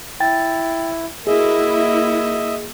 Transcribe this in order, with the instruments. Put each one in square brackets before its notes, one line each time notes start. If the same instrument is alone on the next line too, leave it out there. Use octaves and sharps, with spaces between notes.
[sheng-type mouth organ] E4 [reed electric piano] G5 A6
[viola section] A#3 E4 F#4 [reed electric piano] G#4 [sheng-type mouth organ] D#5 E5